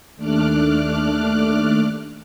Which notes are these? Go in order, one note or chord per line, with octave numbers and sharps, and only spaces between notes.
D#2 A3 D4 D6 F6 F#6